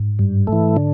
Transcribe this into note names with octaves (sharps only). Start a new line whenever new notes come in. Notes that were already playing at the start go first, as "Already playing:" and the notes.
Already playing: G#2
G2
A3
E3
D3